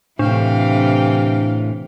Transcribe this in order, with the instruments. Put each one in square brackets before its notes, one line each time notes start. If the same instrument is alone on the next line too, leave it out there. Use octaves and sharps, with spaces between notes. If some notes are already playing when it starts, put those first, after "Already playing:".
[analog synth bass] A2 [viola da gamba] C3 E3 [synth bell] D4 [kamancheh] F5 G5